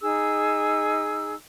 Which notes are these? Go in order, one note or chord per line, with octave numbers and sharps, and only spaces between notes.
D#4 G#4 E6